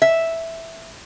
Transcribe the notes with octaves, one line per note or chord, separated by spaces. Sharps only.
E5